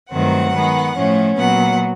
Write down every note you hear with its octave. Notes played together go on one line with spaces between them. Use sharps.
G2 D#3 F#3 A3 C4 F#5
D#3 G#3 B3
A2 F3 A3 C#4
A#2 F#3 B3 F#5